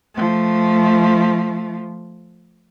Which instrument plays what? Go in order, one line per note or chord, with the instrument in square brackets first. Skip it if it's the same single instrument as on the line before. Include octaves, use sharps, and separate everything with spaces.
[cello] F3 A3